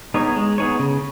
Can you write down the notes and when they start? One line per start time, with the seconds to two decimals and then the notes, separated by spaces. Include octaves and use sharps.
0.14 B3 D#4 G#4 C#5
0.36 G#3
0.58 B3 D#4 G#4 C#5
0.79 C#3